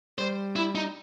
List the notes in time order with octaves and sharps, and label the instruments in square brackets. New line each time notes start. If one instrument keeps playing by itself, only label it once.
[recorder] G3 [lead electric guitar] C5
[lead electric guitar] E4
D#4